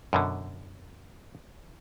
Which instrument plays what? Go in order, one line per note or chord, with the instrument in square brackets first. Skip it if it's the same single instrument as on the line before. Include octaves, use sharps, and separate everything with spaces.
[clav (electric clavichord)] F#2 B2 D3